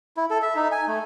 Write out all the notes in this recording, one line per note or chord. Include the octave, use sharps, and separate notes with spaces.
E4
A4
E5
D#4
G#5
A3